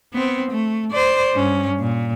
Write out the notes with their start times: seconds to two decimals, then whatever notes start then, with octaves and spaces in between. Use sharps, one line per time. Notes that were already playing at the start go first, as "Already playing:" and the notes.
0.13 B3 C4
0.51 A3
0.91 C5 D5
1.35 G2 C#4
1.80 A#2